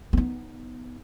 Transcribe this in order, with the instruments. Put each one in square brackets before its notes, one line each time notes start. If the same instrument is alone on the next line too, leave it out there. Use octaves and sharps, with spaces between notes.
[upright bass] B3 D#4